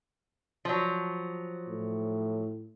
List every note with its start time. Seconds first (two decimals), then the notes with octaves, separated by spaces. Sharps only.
0.65 F3 F#3
1.68 A2